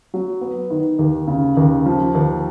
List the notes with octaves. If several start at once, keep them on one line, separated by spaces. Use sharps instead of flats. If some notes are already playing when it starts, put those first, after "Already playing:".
F#3
B3
D#3
D#2
C#3
D#2
F3
D#2